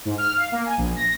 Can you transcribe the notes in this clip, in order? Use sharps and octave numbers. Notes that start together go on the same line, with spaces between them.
G#2
F6
F5
A#3
G#5
A#1
A#6